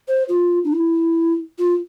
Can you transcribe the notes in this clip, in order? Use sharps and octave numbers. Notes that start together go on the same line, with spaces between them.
C5
F4
D4
E4
F4